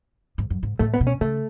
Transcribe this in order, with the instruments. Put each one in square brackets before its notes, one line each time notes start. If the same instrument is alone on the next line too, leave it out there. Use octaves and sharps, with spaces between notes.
[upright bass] G#2
F#2
G#2
[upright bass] A2 [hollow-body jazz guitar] A3
[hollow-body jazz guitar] B3
[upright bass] B2
[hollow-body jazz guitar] C#4
[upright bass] C#3 [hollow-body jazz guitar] A3